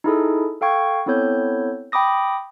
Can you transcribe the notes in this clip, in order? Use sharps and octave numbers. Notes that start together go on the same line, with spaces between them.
D#4 E4 G#4 A4
A4 F5 G5 C#6 G#6
B3 C4 E4 A4 C#5 G6
G5 B5 D6 D#6 A#6